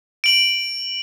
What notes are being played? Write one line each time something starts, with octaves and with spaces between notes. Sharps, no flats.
D7 F#7